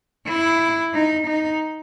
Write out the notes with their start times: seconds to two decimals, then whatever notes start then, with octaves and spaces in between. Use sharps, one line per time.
0.28 E4
0.94 D#4
1.27 D#4